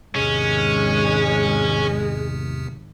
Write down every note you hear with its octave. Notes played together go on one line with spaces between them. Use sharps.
G#1 E2 C3 G#3 C#4